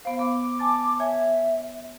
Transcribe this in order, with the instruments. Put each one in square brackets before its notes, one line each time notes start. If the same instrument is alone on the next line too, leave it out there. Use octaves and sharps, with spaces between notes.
[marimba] B3 C5 [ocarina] F5
[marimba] B3 [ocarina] D6
[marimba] G#5 A5 A6
[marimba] C#5 G#5 G#6 [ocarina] E5